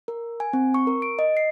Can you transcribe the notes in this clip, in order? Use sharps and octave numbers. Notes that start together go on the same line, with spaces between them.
A#4
G#5
C4
C#6
A#4
D7
D#5
C7